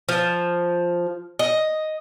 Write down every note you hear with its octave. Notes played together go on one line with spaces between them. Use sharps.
F3
D#5